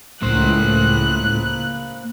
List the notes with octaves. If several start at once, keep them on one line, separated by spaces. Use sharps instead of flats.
C#2 A2 A#3 C5 F#6